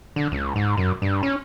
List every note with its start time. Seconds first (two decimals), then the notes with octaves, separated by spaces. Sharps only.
0.16 D3
0.32 C#2
0.56 G#2
0.77 F#2
1.02 G2
1.23 C#4